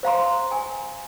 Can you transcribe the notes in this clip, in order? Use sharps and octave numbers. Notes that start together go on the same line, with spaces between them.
C5 F5 A#5 C6
G#5